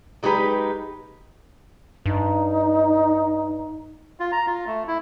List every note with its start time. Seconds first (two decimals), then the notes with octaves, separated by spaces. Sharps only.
0.23 F#3 G#3 D#4 G4 B4
2.06 G2 D#4
4.20 F4
4.32 A#5
4.47 F4
4.67 A3
4.88 E4